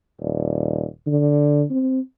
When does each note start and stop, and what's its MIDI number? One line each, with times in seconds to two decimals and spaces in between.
0.20 0.85 27
1.07 1.64 50
1.70 2.00 60